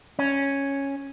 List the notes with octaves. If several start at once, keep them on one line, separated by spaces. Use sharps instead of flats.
C#4